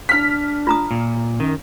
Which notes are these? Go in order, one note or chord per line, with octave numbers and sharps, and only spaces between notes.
D4 F6 B6
F4 A#5 D#6
A#2
F#2 D#3